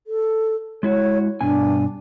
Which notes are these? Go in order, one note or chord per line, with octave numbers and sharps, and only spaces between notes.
A4
G#3 E4 F#4 C#5
G2 B2 D4 G#5